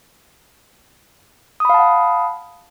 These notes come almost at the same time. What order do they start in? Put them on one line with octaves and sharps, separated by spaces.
D#6 B5 F5 A5 F#5